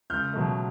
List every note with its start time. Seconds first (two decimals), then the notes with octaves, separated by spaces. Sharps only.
0.10 C#2 F6 G6
0.33 B2 F#3 A3